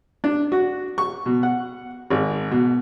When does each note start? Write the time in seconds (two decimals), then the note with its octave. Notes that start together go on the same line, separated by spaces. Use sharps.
0.24 D4
0.52 F#4
0.98 C#6
1.26 B2
1.43 F#5
2.10 G#1
2.51 B2